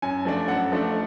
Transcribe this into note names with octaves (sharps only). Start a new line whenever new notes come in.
F#2 G#5
F3 A3 D4
F#2 F#5
F3 A3 D4